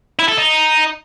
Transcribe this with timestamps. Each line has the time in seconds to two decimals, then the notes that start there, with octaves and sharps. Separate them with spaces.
0.19 E4
0.28 A4
0.38 D#4